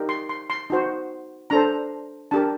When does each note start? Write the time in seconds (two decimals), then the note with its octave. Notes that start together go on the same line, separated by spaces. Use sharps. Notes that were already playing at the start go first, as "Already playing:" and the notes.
Already playing: D#4 G4 A#4
0.09 C6
0.29 C6
0.50 C6
0.70 D#4 F#4 C5
1.50 D4 A4 C5 A#5
2.31 D4 G4 A#4 A5